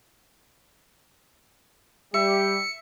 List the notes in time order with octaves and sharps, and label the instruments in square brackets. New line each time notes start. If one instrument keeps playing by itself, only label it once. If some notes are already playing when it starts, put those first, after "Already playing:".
[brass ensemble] G3 G4 [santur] E5 [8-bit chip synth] C#7